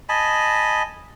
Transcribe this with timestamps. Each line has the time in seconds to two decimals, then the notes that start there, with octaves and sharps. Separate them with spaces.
0.09 D#5 G#5 A5 B5